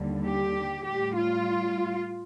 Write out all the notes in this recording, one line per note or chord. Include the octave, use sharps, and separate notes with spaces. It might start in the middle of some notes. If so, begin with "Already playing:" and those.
Already playing: D#2 D3 G3
G4
A2 G3 G4
F4